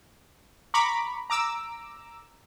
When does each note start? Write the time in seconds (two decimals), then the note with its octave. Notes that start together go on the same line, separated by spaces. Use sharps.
0.74 A#5 B5 C#6 D6
1.30 A#5 D6 E6